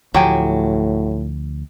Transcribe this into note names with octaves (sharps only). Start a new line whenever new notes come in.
D2 A2 F3 F#3 G4 G5 G#5